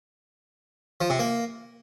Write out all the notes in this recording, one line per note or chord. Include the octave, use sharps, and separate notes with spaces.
F3
C3
A#3